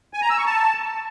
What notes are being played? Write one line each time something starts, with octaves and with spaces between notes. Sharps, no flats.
G#5
A#5
E6
C#6
A5